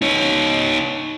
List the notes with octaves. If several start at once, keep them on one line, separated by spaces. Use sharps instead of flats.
D#4 C#5